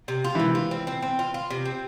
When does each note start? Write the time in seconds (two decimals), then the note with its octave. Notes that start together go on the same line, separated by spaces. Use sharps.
0.08 C3
0.24 F4
0.35 C3 E3 E4
0.55 F4
0.71 C4
0.87 C4
1.02 C4
1.19 F4
1.34 F4
1.50 C3
1.65 C4